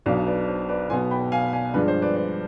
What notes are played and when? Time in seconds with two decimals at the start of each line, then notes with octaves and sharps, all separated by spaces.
0.06 B1 B2 B3 D4 D5 F5
0.27 B4 D5
0.48 C5
0.69 B4 D5
0.90 B1 B2 B3 G#5 C6
1.11 G5 B5
1.32 F5 G#5
1.53 F5 G#5
1.74 G2 F3 G#3 D4 B4
1.88 C5
2.02 B4 D5
2.16 B4 D5